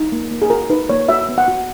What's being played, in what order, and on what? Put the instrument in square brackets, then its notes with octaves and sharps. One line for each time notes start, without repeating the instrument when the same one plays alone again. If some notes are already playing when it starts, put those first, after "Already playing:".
Already playing: [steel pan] D#4
A#3
A#3
G#4
F#4 A#4
D#4 B4
A#3 C#5
F#4 E5
B3
F#5
F#4